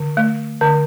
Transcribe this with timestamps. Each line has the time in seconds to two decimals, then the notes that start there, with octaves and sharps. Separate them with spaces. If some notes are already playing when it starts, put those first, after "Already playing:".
Already playing: D3
0.17 A3
0.61 D3